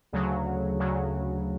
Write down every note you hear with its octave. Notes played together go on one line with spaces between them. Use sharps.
D2 C#3 F#3
D2 C#3 F#3